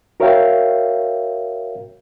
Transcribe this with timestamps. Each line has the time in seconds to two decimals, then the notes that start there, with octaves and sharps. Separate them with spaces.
0.20 F#4 A#4 C#5 E5 F5 G5